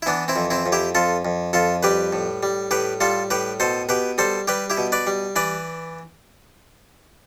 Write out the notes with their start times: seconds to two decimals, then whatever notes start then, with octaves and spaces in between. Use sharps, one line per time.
0.02 E4
0.06 E3 B3 D4
0.28 C4 E4
0.36 F2
0.50 C4 E4
0.66 F2
0.72 E4 G4
0.95 F2 F4 A4
1.25 F2
1.53 F2 F4 A4
1.83 G3 G4 B4
2.13 A2
2.43 G3
2.71 A2 G4 B4
3.01 G3 F4 A4
3.30 A2 G4 B4
3.60 B2 A4 C5
3.89 B2 G4 B4
4.18 G3 A4 C5
4.48 G3 G4 B4
4.70 E4 G4
4.78 B2
4.92 B4 D5
5.07 G3
5.36 E3 B4 D5